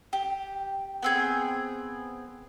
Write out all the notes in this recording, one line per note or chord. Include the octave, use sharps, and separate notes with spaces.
G4
B3 C4 G#4